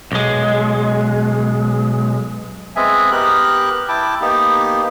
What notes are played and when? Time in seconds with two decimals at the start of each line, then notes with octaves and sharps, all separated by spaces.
0.12 B1 G#3
2.76 G#3 B3 C4 E5 G#5
3.11 B3 G4 A#4 F#6
3.89 E4 G5 A5 D6
4.21 A#3 B3 D#4 G4